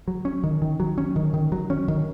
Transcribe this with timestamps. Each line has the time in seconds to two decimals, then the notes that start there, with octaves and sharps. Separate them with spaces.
0.08 F#3
0.25 C#4
0.44 D#3
0.62 D#3
0.80 F#3
0.98 C#4
1.16 D#3
1.34 D#3
1.52 F#3
1.70 C#4
1.88 D#3